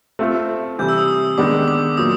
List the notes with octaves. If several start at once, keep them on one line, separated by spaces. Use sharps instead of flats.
A3 C4 F4
C3 E3 G3 G6
E6
D#6
D#6
D#3 G#3 B3 D4 D6
D6
A#2 F#3 A#3 D#6